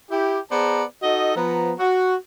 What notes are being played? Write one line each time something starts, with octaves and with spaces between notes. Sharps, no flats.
E4 G4
B3 G#4 C5 D5 A5 A#5
D#4 F#4 A4 D#5
F3 B3 A#5
F#4